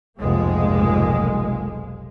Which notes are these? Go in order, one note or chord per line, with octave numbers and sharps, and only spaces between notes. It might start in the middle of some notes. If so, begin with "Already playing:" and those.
F1 B1 G#2 G#3 A#3